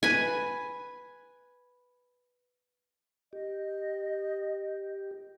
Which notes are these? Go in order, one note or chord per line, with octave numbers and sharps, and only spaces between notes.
B4 G#5
G4 D#5